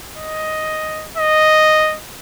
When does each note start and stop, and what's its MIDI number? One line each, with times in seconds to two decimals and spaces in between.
0.17 1.07 75
1.17 1.96 75